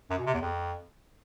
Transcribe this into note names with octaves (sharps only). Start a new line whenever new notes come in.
F#2
B2
C3
E2
F2